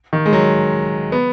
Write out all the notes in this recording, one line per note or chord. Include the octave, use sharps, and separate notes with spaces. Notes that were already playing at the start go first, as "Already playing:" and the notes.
D#3
G#3
F#3
B3